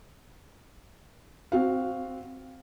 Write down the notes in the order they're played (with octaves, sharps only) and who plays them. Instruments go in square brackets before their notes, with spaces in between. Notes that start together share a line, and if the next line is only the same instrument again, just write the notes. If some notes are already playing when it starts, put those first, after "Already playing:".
[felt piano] C4 F#4 F5